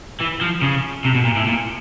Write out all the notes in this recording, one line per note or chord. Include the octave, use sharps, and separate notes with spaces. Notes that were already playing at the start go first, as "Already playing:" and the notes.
E3
F3
C#3
C3
B2
A#2
A2
A#2